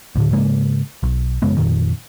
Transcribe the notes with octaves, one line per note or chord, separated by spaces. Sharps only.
D2 A2 D3
G#2 C#3 G#3 A#3
B1
F#2 C#3 G#3 B3
F2 A#2 D#3